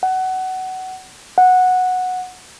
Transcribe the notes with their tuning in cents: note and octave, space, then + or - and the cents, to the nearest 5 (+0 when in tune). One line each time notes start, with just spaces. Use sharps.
F#5 +20
F#5 -10